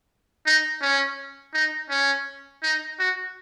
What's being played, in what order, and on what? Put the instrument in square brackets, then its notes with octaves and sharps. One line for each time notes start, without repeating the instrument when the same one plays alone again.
[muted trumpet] D#4
C#4
D#4
C#4
D#4
F#4